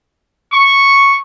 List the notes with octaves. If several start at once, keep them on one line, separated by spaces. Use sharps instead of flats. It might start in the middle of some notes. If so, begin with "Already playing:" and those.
C#6